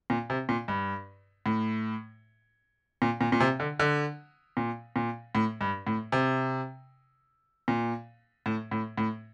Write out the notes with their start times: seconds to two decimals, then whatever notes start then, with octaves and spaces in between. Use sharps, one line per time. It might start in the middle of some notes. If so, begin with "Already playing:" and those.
0.10 A#2
0.30 C3
0.49 A#2
0.68 G2
1.46 A2
3.02 A#2
3.21 A#2
3.32 A#2
3.40 C3
3.60 D3
3.79 D3
4.57 A#2
4.96 A#2
5.35 A2
5.61 G2
5.87 A2
6.12 C3
7.68 A#2
8.46 A2
8.71 A2
8.98 A2